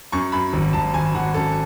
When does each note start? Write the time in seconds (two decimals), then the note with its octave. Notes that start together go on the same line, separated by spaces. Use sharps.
0.12 F#2 C#6
0.32 F#2 B5
0.53 G#1
0.73 G#1 A5
0.94 G#1 G#5
1.14 G#1 F#5
1.34 F#2 A4